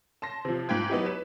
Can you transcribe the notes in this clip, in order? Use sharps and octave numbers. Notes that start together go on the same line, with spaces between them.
A5 C6 A#6
C3 F3
G#2 F4 G5 G#6
F#3 B3 D#4 E4 G4
B4 E7